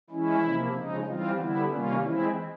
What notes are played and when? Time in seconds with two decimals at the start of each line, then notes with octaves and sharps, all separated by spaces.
0.10 E3 G#3 C#4 E4
0.42 C3 F3 A#3
0.74 C#3 F3 G#3 D#4
1.06 E3 G3 C4 F4
1.38 D3 G3 B3 E4
1.70 C3 D#3 G3 A#3 C#4 F4
2.02 E3 G#3 C4 E4